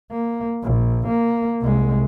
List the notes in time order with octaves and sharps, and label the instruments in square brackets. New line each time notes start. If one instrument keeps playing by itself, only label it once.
[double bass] A#3
A#1
A#3
C2 G#3